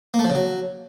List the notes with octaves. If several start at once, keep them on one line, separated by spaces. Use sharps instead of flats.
A#3
A3
F3
C#3
F#3